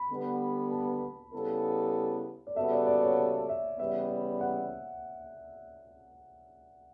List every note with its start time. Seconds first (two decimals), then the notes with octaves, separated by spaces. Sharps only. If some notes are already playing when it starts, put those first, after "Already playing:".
Already playing: B5
0.10 D3 G3 B3
0.71 A5
1.32 C#3 G3 B3 E4 A4
2.47 D5
2.56 C#3 G3 B3 F#4 A4 E5
2.71 D5
2.87 D5
3.02 C#5
3.18 D5
3.49 E5
3.79 E2 C#3 G3 B3 E5
4.41 F#5